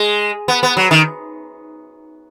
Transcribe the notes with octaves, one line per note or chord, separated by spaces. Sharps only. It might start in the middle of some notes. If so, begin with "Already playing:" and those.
Already playing: G#3
B3
B3
F#3
D#3